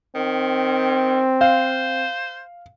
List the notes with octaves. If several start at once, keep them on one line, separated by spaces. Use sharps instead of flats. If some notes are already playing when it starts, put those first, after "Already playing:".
D#3 C4
C5 F5